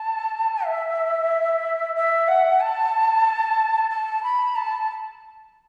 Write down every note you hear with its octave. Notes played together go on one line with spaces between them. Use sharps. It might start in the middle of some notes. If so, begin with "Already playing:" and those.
Already playing: A5
E5
E5
F#5
A5
A5
B5
A5